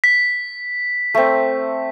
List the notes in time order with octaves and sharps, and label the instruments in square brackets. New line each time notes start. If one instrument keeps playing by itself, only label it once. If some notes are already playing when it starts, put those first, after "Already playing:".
[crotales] B6
[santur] A3 C4